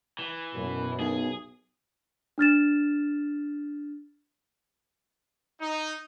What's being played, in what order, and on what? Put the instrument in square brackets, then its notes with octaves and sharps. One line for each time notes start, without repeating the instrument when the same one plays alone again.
[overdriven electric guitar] E3
[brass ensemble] F#2 [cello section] B2
[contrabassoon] B1 [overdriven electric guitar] G#4
[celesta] D4 F6 A6 E7
[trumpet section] D#4